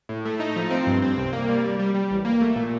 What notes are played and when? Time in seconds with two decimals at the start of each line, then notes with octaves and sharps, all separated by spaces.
0.09 A2
0.25 A3
0.40 D#4
0.56 F3
0.71 C4
0.87 G2
1.02 C4
1.17 C2
1.33 A#3
1.49 G3
1.64 G3
1.79 G3
1.95 G3
2.11 A1
2.25 A#3
2.41 A3
2.56 A#2